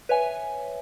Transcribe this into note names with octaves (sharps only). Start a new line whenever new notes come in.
B4 C#5 E5 G#5